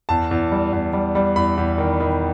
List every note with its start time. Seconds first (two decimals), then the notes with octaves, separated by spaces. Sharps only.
0.09 E2 A5
0.31 E2
0.52 G3
0.73 E2
0.93 G3
1.15 G3
1.36 E2 B5
1.57 E2
1.78 D#3
2.00 D#3